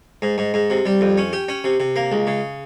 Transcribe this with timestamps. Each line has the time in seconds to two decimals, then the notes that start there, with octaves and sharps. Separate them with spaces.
0.22 G#2
0.38 G#2
0.54 G#2
0.70 C3
0.85 G3
1.01 F2
1.18 C#4
1.33 G4
1.49 C#4
1.64 C3
1.80 C3
1.96 A#3
2.12 C#2
2.27 C#3